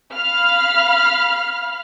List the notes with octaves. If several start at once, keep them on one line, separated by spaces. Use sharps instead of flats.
F5 B5 F6